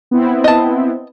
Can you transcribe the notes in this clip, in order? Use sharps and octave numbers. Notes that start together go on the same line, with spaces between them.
B3 C4 E4
D#5 A5